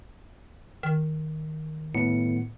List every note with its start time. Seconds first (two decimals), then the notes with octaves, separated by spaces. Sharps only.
0.83 D#3
1.95 A2 B3 C#7